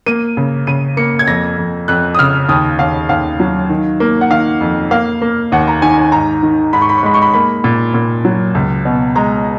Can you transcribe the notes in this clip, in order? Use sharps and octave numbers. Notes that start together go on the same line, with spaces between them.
A#3 D#7
C#3
C#3 D#7
A#3 C#7
G#6
F2 A#6
F2
F2 F#6
D#6
C#3 F6
D#2 D#6
D#2 F5
D#2 F5
F#3
D#3
A#3
F#5
D#3 F5
F2
A#3 F5
A#3
D#2 F#5
A#5
D#3 G#5
G#5
G#2 A#5
D#3
G#2 B5
C#6
B5
C#6
G#3 B5
C#6
B5
A#3 B5
A#2
A#2
F#3
C#2
B2
G#3 A#5